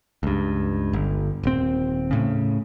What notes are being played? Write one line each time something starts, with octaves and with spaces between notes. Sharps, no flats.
C#2 G2
G1
D#1 C4
A2 C#3